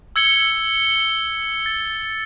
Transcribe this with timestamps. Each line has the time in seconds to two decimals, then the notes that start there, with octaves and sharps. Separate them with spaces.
0.16 E6 G#6 C#7 G7
1.66 A6